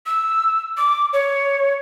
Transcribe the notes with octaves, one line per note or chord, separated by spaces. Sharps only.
E6
D6
C#5